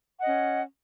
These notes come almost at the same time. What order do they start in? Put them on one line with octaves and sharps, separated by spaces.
F#5 D#5 C#4